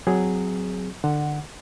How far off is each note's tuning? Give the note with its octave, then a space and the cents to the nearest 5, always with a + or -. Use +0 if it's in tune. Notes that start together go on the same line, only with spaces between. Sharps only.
F#3 +0 C4 -20 G#4 +0
D3 +25 F#5 +0